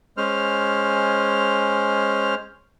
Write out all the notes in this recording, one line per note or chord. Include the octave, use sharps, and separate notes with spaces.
G#3 C#4 C5 F6